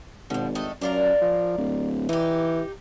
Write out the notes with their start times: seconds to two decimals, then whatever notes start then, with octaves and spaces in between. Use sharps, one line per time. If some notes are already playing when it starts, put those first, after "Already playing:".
0.30 G#1 B2 F3
0.55 A2 A3 D#5
0.81 F#2 D4 F4 A#4
1.22 F3
1.58 D1
2.09 E3 D#4 G4